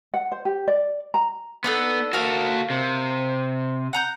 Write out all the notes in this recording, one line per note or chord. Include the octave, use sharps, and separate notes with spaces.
F#5
C5
G4
D5
A#5
B3 D4 D#4 A4
F#4 A4 A#4 F5
C3
F#5 A#5 G6